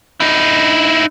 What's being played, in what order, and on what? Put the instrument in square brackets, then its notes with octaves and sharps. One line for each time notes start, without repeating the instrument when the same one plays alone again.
[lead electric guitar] D#4 E4